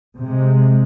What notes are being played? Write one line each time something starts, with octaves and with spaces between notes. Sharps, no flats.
C3 G#3